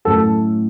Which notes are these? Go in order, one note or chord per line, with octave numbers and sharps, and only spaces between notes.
A2 F#3 C#4 E4 A4